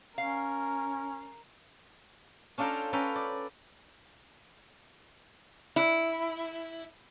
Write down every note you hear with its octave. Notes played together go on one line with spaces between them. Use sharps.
C#4 A#4 F5
C#4 D4 F4 A4 G5 A#5
C#4 A4 B4 G5 A#5
D5
E4